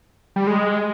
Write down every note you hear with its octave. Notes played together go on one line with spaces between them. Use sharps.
G3
G#3